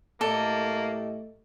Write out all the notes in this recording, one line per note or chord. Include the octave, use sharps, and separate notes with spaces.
A2 A3 A#3 G4 A4 D5 D#5